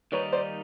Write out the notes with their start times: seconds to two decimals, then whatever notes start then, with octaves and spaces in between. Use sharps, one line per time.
0.12 D#3 G3 A#3 D#4 B4 C#5
0.33 C5 D5